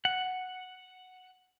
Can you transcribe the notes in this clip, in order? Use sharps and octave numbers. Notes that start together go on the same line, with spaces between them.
F#5